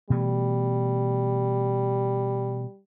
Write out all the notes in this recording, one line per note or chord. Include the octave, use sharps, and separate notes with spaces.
B2 E3 G3 A3